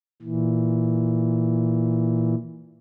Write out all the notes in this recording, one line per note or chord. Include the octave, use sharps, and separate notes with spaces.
A#2 E3